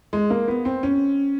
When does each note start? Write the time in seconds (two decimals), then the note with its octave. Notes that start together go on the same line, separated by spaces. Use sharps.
0.13 G#3
0.30 A#3
0.48 B3
0.65 C4
0.83 C#4